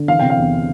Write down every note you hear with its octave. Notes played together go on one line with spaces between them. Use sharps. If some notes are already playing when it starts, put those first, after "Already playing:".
Already playing: D3
E3 F5
C3 G5
F5
E2